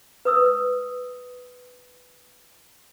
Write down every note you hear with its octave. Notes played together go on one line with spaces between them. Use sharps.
B4 D#6 E6